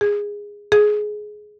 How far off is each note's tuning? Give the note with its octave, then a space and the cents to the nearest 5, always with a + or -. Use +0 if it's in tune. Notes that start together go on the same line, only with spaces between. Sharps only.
G#4 -15
G#4 +15